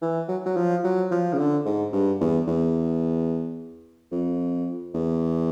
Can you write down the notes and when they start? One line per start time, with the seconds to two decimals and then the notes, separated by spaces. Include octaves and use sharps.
0.02 E3
0.28 F#3
0.45 F#3
0.56 F3
0.84 F#3
1.11 F3
1.33 C#3
1.38 D3
1.65 G#2
1.93 G2
2.20 E2
2.47 E2
4.12 F2
4.94 E2